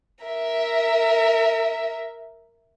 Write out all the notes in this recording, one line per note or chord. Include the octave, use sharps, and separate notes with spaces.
A#4 E5